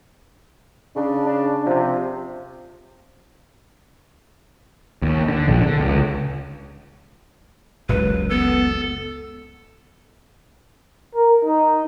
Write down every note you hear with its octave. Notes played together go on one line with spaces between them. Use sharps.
C#3 D4
D4
C3 F3
D#2
D3
A#1
D3
C#2
F#1 C#2 B4
B3 A4
A#4
D#4